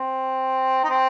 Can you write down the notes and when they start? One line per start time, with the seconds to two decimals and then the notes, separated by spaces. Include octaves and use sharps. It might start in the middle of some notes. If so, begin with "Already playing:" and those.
Already playing: C4
0.84 D#4
0.90 C4